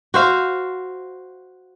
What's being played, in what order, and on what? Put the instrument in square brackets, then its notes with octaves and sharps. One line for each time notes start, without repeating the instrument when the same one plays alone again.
[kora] F#4 C5 F5